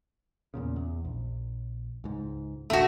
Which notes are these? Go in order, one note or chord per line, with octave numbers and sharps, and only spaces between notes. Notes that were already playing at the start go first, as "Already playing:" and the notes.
E2 A#2 C#3
E2
A#1
C#2 G#2
F1 A#1 D#2 A3 F#4